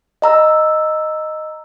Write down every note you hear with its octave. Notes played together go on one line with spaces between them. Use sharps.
D#5 A#5 E6